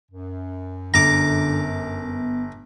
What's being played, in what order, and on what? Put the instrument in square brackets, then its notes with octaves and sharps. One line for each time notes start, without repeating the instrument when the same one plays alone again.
[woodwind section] F#2
[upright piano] G1 [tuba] D3 [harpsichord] A#5 D6
[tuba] B3